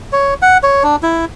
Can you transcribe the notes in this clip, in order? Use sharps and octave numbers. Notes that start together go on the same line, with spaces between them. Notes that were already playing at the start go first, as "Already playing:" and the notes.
C#5
F#5
C#5
D4
E4